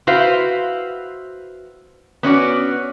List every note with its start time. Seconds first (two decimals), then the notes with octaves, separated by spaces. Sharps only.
0.07 E4 F#4 B4 C5 F5
2.23 B3 C#4 F#4 D5